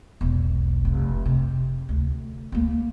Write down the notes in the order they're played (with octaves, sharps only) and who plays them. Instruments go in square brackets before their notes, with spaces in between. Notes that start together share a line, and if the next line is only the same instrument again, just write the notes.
[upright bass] E1 B1
F1
C3
D2
D2 A#3